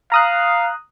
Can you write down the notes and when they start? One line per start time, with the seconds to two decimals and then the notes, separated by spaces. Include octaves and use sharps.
0.12 F5 A#5 D#6 F#6